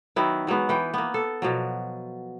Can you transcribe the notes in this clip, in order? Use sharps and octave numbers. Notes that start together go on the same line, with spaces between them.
D#3 F#3 B3 E4
E3 F#3 G#3 B3
E3 B4 G5
A#3 B3
A4
B2 F3 F#3